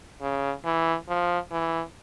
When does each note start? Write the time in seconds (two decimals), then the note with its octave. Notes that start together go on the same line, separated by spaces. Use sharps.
0.21 C#3
0.65 E3
1.08 F3
1.51 E3